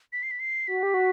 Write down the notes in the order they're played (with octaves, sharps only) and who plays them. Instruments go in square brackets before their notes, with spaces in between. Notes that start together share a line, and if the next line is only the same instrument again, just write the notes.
[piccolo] B6
C7
B6
C7
[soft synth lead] F#4 [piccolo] B6
[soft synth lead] G4
F#4